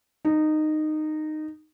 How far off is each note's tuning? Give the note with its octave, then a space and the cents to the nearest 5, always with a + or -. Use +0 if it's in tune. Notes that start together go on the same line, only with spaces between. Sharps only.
D#4 -15